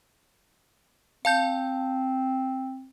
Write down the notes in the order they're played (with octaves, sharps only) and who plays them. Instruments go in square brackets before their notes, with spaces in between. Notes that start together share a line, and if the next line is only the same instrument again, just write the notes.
[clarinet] C4 [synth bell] F5 A5 G6